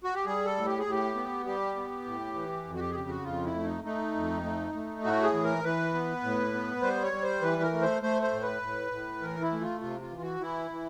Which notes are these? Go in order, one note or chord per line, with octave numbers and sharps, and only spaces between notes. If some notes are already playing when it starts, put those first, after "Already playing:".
F#4
G4
G3 G#4
A4
A2
G4
G#4
A2 G4
B3
G3 G4
B3
A2
E3
F2
F#4
G4
G#4
C#3 G4
F#4
F2 F4
E4
A3
D#4
A3 D#4
F2
A3
A3
A2 F#4
G#4
E3
A#4
E3 B4
B3
A2
B3
G3 C5
C#5
G3
C5
E3 B4
A#4
A3
C5
A3 C5
C5
A2
B4
A2
A2
E3 A#4
E4
A3
F4
C3 F4
F4
E3
F#4
E3 E4
E3